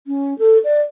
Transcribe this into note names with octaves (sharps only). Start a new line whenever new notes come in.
C#4
A4
D5